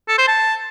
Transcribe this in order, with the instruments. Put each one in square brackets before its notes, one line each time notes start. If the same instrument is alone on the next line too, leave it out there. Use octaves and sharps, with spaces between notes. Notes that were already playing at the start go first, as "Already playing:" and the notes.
[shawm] A4
C5
A5